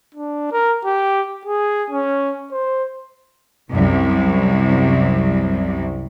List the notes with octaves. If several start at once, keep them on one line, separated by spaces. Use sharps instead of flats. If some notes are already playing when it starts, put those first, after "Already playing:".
D4
A#4
G4
G#4
C#4
C5
C2 F#2